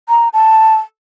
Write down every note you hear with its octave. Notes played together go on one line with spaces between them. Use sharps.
A#5
A5